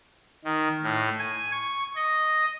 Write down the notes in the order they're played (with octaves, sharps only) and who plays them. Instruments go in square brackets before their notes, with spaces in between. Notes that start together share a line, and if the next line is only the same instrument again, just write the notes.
[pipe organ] D#3
A2
G#5
C#6
D#5